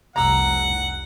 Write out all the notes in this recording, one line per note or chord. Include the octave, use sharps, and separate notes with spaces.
F1 C2 G3 F#5 A#5 E6